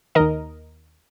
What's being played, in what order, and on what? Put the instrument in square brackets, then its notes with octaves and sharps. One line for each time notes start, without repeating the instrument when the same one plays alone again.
[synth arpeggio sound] D#2 D#3 A#4 D#5